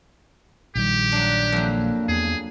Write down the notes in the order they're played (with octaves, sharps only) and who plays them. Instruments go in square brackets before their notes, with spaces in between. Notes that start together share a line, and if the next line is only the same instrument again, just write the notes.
[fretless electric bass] A#1 D#3 G3 [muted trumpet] G4
[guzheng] F#3 D4
[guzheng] F2 F#3 [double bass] A#3
[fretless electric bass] E2 [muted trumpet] G#4